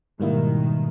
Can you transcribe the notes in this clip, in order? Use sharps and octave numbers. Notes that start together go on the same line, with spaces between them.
G#2 B2 D#3 G3 A#3 E4